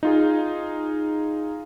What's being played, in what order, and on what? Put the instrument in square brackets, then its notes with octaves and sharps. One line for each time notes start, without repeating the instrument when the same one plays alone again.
[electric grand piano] D#4 F4 G#4